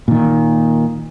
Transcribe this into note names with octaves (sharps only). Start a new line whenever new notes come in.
A#2 D#3